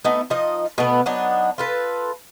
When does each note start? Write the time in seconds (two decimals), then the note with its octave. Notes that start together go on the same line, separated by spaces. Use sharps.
0.05 A3 B3 D#4
0.30 F3 D#4 D#5
0.78 B2 A3 B3
1.06 F#3 B3 D4 D#4
1.58 F4 A4 B4